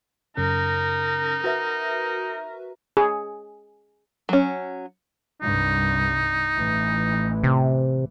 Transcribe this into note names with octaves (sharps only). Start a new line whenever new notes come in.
F#2 C#3 C#4 D#4 A#4
F#4 A#4 B4 E5
G#4
F#3 C#4
C2 G2 D#4
A1 E3
C3